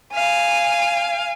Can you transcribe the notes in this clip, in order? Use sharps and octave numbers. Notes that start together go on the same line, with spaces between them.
F5 G#5